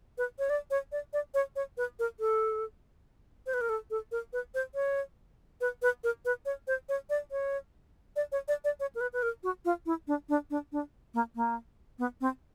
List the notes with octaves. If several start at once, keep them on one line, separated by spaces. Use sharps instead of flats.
B4
C#5
D5
C#5
D5
D5
C#5
C#5
B4
A#4
A4
C5
B4
A#4
A4
A4
A#4
B4
C5
C#5
B4
B4
A#4
B4
C#5
C5
C#5
D5
C#5
D5
C#5
D5
D5
C#5
A#4
B4
B4
A#4
F#4
F4
E4
D4
D4
D4
D4
A#3
A#3
B3
C4